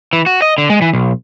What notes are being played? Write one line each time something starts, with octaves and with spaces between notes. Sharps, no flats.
E3
F#4
D#5
D3
G#3
E3
B1